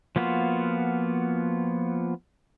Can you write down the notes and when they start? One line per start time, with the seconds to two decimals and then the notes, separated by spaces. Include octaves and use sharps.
0.16 F3 A#3 B3 F4 F#4